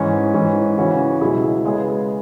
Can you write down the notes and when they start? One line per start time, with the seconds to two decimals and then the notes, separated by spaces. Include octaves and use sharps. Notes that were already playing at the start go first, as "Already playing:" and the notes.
Already playing: G#2 E3 C#4
0.34 G#2 E3 C#4
0.77 C#3 E3 C#4 F#4
1.21 C#2 B2 F#3 E4 G#4
1.65 C#3 G#3 B3 G#4